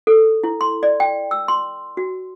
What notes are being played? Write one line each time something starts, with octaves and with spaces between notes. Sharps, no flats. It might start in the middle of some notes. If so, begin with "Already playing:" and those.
A4
E4
C6
D5
G5
E6
C6
F#4